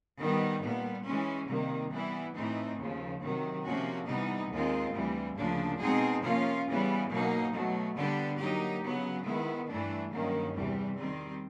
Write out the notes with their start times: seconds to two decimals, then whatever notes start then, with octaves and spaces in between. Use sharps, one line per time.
0.18 D#3 G3 B3 D#4
0.62 A#2 G3 B3
1.04 E3 G#3 C#4
1.48 C3 D#3 G3 A#3
1.91 E3 G3 B3 E4
2.35 A2 E3 A3 C4 D#4
2.78 D#2 C#3 F3
3.21 C3 D#3 F#3
3.64 C3 F3 A#3 C#4 F#4
4.07 C3 E3 G3 B3 D#4
4.51 D#2 D#3 G#3 C4 F4
4.93 D2 C3 E3 G3
5.36 D2 C#3 F3 A#3 D4
5.79 B2 G#3 C4 D#4 G#4
6.22 C3 F3 A#3 C#4 F4
6.66 C#3 E3 G3 B3
7.09 B2 F#3 A#3 D#4
7.52 B2 F#3 A3
7.96 D3 G3 B3 D4 G4
8.38 F#3 A#3 D#4 G4
8.82 C#3 F#3 B3
9.25 D#3 G#3 B3 E4
9.68 G2 E3 A3 D4
10.11 G2 D#3 F#3 A#3 C#4
10.55 E2 C3 E3 G3
10.97 D#3 G3 C4